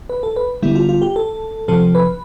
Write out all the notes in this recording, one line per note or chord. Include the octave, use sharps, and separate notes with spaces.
B4
A4
B4
D3 G3 B3 E4
F4
F4
G4
A4
C3 F3 C4 A4
B4